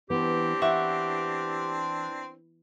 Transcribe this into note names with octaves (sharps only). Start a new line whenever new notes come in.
E3 B3 C4 D4 G4
E3 E5 F#5 C#6